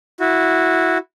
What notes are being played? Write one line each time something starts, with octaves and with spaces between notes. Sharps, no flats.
E4 F#4